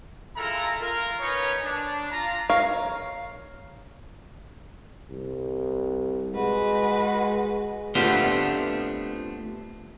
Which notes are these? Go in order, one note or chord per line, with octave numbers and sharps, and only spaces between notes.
G#3 E4 F4 A4 A#4 A#5
F4 A#4
C#4 D#4 B4 C#5
D4
F4 A#5
A#4 C#5 F5
C2
G#3 F#4 B4
A3 B3 C4 D4 F4 G4